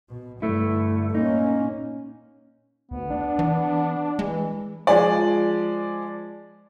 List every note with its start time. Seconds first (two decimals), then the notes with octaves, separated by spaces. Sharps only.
0.10 B2
0.42 G2 D3 A3 E4
1.15 A#2 A#3 C#4 D#4
2.91 D2 B3
3.10 D4
3.39 E3
4.19 E3 G#3
4.87 F3 G#3 D5